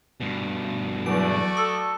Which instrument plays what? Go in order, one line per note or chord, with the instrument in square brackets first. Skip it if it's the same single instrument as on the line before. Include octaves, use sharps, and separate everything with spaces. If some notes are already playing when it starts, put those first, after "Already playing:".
[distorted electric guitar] G2 B2
[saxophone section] E2 [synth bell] F#3 D7 [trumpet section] A3 F#4 D5
[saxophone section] A4 [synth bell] D#6